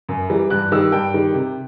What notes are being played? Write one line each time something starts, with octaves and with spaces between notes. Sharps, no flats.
F#2
E3 G3
G2 F#6
D#3 G3 E6
G2 G5
D#3 G3
C3